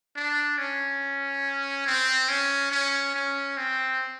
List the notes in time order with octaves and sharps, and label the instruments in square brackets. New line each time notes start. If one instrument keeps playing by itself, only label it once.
[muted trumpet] D4
C#4
C4
C#4
C#4
C#4
C4